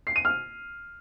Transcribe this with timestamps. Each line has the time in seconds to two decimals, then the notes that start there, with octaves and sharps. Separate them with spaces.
0.07 C7
0.16 D#7
0.25 F6